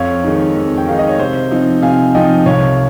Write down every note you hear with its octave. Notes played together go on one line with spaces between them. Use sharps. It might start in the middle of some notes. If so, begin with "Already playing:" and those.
Already playing: F2 C#5 F5
D#3 G#3 D#4
F2
G5
D#3 G#3 D#4 F5
D#5
C#5
C3 C5
F3 C4 D#4
C3 F5 G#5
F3 C4 D#4 D#5 G5
C2 C#5 F5